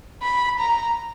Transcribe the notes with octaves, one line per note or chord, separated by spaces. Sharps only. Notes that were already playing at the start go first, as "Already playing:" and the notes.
B5
A#5